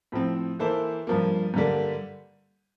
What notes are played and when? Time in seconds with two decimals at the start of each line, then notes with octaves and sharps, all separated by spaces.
0.12 A2 F3 C4
0.59 E3 A#3 E4 A4 C5
1.07 G2 F3 A#3
1.54 G2 D3 G3 A#3